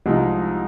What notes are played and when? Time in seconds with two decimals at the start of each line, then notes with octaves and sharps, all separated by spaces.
0.06 C2 C3 F3 G#3 D#4